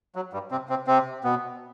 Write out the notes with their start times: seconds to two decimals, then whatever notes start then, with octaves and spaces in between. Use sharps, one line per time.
0.16 F#3
0.33 G2 G3
0.51 C3 C4
0.69 C3 C4
0.87 C3 C4
1.24 B2 B3